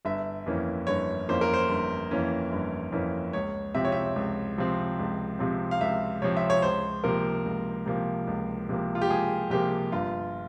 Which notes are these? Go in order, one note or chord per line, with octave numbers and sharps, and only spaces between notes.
G1 E5
F2 E3 A#3 C#4
G1 C#5
F2 E3 A#3 C#4 C5
A#4
C5
G1
F2 E3 A#3 C#4
G1
F2 E3 A#3 C#4
C#2 C#5
C3 F3 C4 E5
C#5
E5
C#2
C3 F3 C4
C#2
C3 F3 C4
F5
C#2 E5
C3 F3 C4 C#5
E5
C#5
C#2 C5
C3 F3 A#3 A#4
C#2
C3 F3 A#3
C#2
C3 F3 A#3
F4
G4
C#2 G#4
C3 F3 A#3 G4
G1 F4